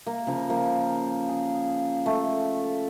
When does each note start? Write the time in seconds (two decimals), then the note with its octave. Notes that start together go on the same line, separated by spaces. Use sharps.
0.06 A#3
0.27 C#3 F3
0.49 F3 A#3
1.29 G#4
2.06 A3